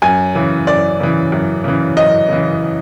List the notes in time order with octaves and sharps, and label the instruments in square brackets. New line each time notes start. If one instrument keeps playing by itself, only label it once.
[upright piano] F#2 G#5
C#3 E3
F#2 D5
C#3 E3
F#2
C#3 E3
F#2 D#5
C#3 E3